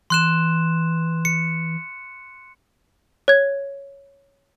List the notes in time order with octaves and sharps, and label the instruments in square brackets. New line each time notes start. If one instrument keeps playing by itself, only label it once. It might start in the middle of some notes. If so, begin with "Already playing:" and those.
[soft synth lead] E3 [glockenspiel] C6 F#6 E7
[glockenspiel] C#7
[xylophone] C#5 G#6